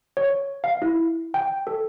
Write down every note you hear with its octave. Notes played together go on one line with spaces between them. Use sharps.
C#5
F5
E4
G5
A4